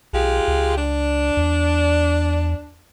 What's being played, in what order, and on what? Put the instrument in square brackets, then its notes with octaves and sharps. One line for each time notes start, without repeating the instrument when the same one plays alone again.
[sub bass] B1 [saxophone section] G#3 F4 G4
[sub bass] C#2
[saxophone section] D4
[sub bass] E2